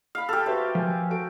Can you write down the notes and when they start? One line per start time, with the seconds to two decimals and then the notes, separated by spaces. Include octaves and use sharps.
0.15 F5 B5
0.29 G4 A4 F6
0.46 F#4 B4 C5 E5
0.75 F3 A#4 G#5
1.10 F#4 A4 D7